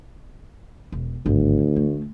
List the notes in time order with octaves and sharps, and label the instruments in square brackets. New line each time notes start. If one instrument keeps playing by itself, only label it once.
[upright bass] E1
[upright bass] G#1 G2 [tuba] D2
[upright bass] A3